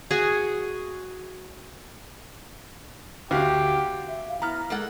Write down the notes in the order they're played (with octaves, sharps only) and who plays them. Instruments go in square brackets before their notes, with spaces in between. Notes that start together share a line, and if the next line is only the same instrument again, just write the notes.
[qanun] F#4 G#4
[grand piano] D2 F#4 F5 [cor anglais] G4
[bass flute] E5
F5
[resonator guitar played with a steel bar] B3 [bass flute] E4 [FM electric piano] A#5 F6
[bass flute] G#3 [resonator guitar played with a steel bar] A#3 A4 F#5